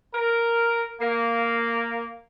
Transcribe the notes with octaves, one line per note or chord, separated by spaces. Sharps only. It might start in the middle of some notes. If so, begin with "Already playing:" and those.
A#4
A#3